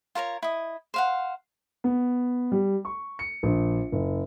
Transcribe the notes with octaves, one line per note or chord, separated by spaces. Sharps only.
F4 A#4 C#5 A#5
E4 D#5
C5 F5 F#5
B3
G3
C#6
C#7
A#1
F#1